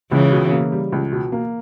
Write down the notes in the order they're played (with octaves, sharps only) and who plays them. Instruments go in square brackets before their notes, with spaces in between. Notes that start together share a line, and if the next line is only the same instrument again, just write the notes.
[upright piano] C#2 [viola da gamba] C#3 E3
[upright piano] B2
A#3
G3
C#2
B2
A#3